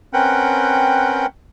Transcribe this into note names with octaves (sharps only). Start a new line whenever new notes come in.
C4 C#4 A#4 B4 F#5 G5